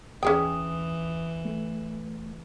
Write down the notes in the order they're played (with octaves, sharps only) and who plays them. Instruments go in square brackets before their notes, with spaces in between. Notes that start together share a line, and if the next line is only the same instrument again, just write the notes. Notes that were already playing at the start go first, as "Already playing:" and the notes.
[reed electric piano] D#2 D#6 [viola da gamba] E3 [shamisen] C#4 G#4 G5
[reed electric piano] A3